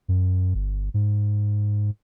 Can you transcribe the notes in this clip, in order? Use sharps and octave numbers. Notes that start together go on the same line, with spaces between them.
F#2
G1
G#2